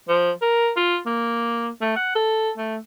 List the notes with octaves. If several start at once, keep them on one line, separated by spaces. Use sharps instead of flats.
F3
A#4
F4
A#3
A3
F#5
A4
A3